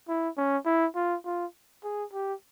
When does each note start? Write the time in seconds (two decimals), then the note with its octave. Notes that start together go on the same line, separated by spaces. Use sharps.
0.09 E4
0.37 C#4
0.66 E4
0.95 F4
1.25 F4
1.84 G#4
2.13 G4